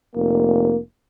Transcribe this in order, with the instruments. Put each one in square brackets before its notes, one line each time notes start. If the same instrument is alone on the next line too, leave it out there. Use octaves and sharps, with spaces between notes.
[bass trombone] F1 [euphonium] A#3